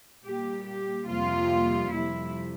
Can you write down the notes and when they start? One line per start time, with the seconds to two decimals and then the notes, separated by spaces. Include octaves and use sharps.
0.24 A#2 G3 A#3 G4
0.67 G4
1.08 F2 C3 G3 A#3 F4
1.93 F2 C3 G3 E4